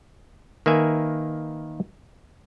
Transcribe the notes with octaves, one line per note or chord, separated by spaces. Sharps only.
D#3 A#3 B4 E5 G#5